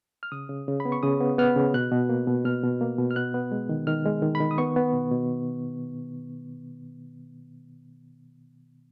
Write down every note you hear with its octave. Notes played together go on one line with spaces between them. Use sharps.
F6
C#3 D#6
C#3
C#3
B5
B3
C#6
C#3 D#6
B3
B3 F6
C#3
B2 F#6
B2
A#3
B2
B2 F6
B2
A#3
B2
F6
B3 F#6
B3
G#3
D#3
D#3 F6
G#3
D#3
B5
D#3
D#6
B3 C#6
B3
B2
B2